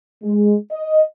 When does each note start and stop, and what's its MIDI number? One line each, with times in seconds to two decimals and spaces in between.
0.23 0.55 56
0.71 1.02 75